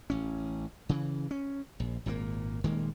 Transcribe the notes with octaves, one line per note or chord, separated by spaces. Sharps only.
A1 C#4
C#3 E3
C#4
A#1
G#1 A#2 D#3 A#3
D#1 D#3 G#3 A#3